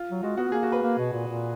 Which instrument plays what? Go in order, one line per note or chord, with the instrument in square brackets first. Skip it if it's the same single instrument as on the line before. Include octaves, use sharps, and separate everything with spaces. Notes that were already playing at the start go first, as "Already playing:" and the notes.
Already playing: [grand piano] F4
[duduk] F#3
[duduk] G#3 [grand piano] F#4
[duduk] B3 [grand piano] F#4
[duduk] B3
[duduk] A#3 [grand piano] G#4
[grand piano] F#4
B4
[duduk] A#3
B2
A#2
A#2